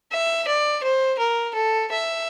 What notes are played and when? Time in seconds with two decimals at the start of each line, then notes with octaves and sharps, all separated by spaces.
0.12 E5
0.48 D5
0.84 C5
1.19 A#4
1.55 A4
1.92 E5